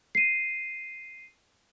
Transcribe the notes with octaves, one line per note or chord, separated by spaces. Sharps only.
C7 D#7